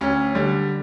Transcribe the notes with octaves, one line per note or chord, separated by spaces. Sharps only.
D2 C#4
D3 G3